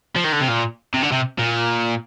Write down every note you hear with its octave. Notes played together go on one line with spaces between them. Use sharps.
F3
D#3
D3
C3
A#2
C3
D3
C3
A#2